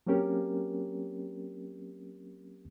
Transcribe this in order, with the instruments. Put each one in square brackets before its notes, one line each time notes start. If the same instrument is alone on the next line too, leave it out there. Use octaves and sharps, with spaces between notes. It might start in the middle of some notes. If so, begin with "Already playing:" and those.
[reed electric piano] F#3 A#3 C4 C#4 G4 A#4